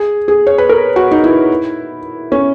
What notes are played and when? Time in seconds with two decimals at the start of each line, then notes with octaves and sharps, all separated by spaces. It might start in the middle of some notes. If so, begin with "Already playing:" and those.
Already playing: G#4
0.28 G#4
0.47 C#5
0.58 B4
0.69 A#4
0.96 F#4
1.11 D#4
1.24 E4
2.32 C#4